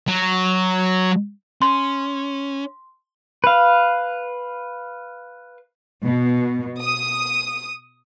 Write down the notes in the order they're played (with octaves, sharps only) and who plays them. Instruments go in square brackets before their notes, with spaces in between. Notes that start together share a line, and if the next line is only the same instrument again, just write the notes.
[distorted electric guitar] F#3
[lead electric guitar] C#4 [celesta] C6
[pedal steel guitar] B4 F5
[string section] B2
D#6